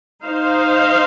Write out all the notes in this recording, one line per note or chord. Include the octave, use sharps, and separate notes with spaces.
D#4 C5 F5